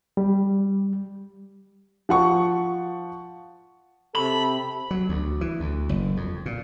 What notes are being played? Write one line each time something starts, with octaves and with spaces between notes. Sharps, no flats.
G3
F3 F#5 C#6
C3 G4 A4 B5
F#3
D2
E3
D2
F#1
F2
A#2